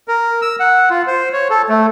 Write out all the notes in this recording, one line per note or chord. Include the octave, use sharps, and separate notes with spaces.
A#4
E6
F#5
F4
C5
C#5
A4
A3